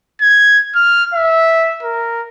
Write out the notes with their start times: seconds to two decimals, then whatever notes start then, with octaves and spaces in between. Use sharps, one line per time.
0.21 G#6
0.75 F6
1.14 E5
1.83 A#4